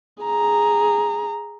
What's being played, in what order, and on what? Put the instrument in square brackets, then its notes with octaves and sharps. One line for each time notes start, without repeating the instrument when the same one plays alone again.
[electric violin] G#4 A#5